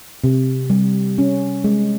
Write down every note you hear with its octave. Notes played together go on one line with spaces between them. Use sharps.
C3
G3
C#4
G#3